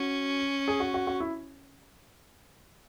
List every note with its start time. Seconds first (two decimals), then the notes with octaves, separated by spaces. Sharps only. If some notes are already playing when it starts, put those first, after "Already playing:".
Already playing: C#4 F#4
0.68 G#4
0.80 F#4
0.94 F#4
1.07 F#4
1.20 E4